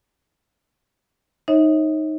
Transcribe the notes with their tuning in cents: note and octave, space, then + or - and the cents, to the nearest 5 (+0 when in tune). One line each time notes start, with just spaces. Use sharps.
D#4 +0 C#5 -25 E5 -40